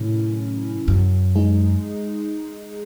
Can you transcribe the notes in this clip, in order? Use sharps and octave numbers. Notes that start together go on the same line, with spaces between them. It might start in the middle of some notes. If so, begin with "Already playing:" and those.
Already playing: A2 C3 D#3 F#3 C#4 E4
F#2
G#3 D#4 G#4